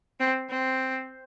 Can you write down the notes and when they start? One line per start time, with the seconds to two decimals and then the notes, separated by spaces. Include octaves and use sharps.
0.20 C4
0.49 C4